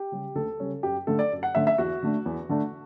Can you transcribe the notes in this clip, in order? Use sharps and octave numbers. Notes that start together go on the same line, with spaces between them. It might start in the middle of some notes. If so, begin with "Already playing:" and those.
Already playing: G4
C#3 G3 C#4
D2 A4
C#3 G3 C#4
F#2 G4
D3 A3 C#4 A4
D5
F#2
F#5
D3 A3 C#4 E5
E5
E2 F#4
D3 A3 D4
E2
D3 A3 D4